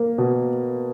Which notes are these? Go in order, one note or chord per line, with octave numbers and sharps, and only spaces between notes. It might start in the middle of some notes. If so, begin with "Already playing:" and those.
Already playing: A#3
B2